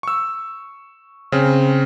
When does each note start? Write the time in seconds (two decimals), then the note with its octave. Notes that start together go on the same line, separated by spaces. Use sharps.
0.03 C#6 E6
1.32 C#3 C4